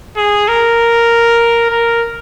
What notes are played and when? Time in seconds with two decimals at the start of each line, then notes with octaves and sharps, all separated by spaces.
0.17 G#4
0.48 A#4
1.70 A#4